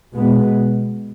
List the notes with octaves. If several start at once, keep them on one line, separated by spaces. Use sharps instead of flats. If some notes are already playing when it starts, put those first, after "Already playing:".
B2 G#3 B3